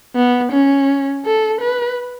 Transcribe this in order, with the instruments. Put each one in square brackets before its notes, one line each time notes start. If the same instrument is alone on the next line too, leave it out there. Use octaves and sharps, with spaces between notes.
[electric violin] B3
C#4
A4
B4